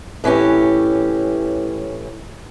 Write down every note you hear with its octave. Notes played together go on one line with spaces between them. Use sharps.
A2 E3 C#4 G4